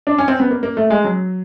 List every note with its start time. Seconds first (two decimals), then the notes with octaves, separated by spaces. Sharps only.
0.07 D4
0.18 C#4
0.28 C4
0.40 B3
0.51 A#3
0.63 A#3
0.77 A3
0.90 G#3
1.04 F#3